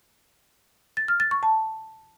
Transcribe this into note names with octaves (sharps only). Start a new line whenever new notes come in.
A6
F6
A6
C#6
A5